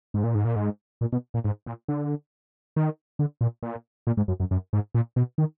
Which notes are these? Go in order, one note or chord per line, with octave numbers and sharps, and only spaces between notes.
G#2
A#2
G#2
A#2
G#2
A#2
B2
A#2
G#2
A#2
D3
D#3
D3
A#2
A#2
A#2
G#2
F#2
F#2
F#2
G#2
A#2
B2
D#3